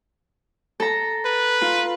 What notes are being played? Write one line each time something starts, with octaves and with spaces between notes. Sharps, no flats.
A4 A#5
B4
F4